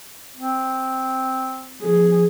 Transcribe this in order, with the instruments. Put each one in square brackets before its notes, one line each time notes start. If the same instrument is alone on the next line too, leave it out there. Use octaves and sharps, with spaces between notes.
[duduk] C4
[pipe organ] F3 [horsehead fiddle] G#4